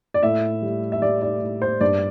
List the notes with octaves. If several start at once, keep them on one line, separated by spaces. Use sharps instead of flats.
D5
A2 E5
G3
E5
G3 D5
D5
A2
C5
G2 D5